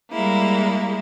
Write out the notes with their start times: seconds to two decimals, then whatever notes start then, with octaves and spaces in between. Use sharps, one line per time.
0.12 G3 G#3 A#3 E4